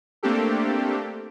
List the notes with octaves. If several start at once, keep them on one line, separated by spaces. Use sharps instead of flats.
A3 A#3 C4 D4 G4 A4